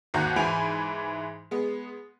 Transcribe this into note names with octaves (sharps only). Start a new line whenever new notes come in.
G#1 D#2 F#4 F#5 A#5 G6
G#2 E3 G#5 B5 D7 F7
G#3 B3